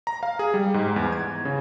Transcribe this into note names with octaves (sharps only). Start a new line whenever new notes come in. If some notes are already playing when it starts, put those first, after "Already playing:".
A#5
F5
G#4
G3
G#2
E2
G#6
C#3